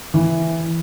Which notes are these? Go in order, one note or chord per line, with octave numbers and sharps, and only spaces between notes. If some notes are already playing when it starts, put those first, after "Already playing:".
E3